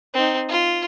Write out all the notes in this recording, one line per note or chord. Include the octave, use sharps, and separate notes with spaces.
C4 D#4
F4